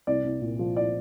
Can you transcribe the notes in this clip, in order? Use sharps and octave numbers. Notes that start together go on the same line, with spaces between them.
C2 D5
C2
A#2
F3
D5